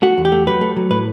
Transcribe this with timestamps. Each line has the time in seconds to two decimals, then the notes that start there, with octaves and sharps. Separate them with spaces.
0.02 A3 F#4
0.18 E2
0.25 G4
0.32 A3
0.47 F#3 B4
0.61 A3
0.76 F#3
0.91 A2 B4